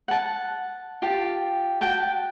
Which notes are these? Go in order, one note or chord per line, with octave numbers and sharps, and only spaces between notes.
F#5 A5
F4 G4 A5
F#4 G5 A5